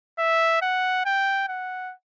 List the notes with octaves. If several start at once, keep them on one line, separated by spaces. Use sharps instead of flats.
E5
F#5
G5
F#5